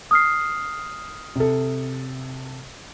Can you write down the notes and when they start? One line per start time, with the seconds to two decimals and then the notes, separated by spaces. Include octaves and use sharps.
0.11 D#6 F6 C7
1.36 C3 A4